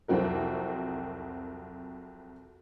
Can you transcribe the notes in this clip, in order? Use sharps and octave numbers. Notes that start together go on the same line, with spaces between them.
C2 F2 F#3 C4 F#4 A#4